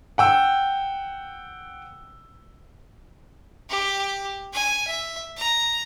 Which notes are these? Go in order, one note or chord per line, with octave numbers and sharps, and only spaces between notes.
F#5 G5 E6
G4
G#5
E5
A#5